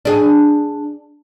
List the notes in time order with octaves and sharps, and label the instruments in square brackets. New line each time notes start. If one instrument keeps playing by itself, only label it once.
[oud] D4 G#4